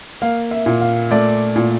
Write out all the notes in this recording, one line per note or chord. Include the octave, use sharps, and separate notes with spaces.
A#3 F5
E5
A#2
F5
A3 D5
A#2